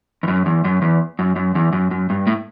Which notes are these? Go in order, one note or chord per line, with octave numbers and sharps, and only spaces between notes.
E2
F#2
E2
F#2
E2
F#2
F#2
E2
F#2
F#2
G2
A2